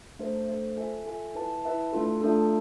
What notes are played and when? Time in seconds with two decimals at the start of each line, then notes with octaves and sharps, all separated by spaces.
0.19 A3 D4 A4 C5
0.49 A3 D4 A4 C5
0.77 F4 A4 E5 G#5
1.06 F4 A4 E5 G#5
1.35 E4 B4 E5 A5
1.64 E4 B4 E5 A5
1.93 A3 D4 F4 A4
2.21 A3 D4 F4 A4